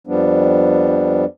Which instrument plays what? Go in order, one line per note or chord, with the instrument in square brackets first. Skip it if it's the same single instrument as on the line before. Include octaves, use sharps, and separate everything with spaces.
[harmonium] F2 F3 G3 B3 D4